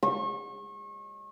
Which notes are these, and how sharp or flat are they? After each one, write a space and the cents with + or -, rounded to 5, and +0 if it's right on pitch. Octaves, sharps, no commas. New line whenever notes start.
C#6 -35